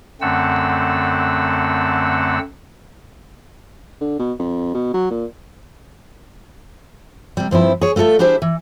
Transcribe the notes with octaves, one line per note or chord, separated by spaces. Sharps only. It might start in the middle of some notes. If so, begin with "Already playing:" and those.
F#2 D3 A3 C4 F#5 E6
D3
B2
F2
B2
F#3
A#2
C3 G3
G2 F3 C4 E4
G#4 C#5
A3 F4 F#4 A4 E5
D4 E4 G4 G#4 C5 E5
E3